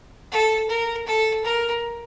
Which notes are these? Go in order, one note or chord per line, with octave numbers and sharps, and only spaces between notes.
A4
A#4
A4
A#4